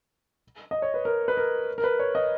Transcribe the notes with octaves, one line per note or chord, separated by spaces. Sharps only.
D#5
C#5
B4
A#4
B4
A#4
A#4
B4
C#5
D#5